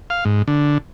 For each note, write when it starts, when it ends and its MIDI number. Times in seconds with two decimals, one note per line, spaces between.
0.10 0.24 77
0.25 0.43 44
0.48 0.78 50